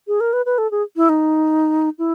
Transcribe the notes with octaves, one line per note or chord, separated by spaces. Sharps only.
G#4
A#4
B4
B4
A4
G#4
E4
D#4
E4